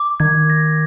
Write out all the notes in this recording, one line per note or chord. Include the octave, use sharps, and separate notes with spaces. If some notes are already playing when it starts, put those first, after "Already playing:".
Already playing: D6
D#3 G#6
A#6